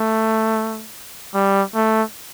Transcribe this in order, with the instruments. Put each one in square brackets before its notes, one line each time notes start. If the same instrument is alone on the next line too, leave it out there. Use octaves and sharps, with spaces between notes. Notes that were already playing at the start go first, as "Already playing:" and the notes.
Already playing: [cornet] A3
G3
A3